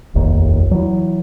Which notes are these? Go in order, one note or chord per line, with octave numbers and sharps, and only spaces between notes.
F1 A#1 D#2 D#3
E3 F#3